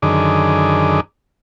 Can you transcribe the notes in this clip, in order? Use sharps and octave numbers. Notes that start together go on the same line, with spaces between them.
F#2 D3 D#3 G#4 D6